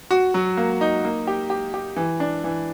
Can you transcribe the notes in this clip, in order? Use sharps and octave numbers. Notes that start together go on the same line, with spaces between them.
F#4
F#3
A#3
D#4
A#3
G4
G4
G4
E3
D4
E3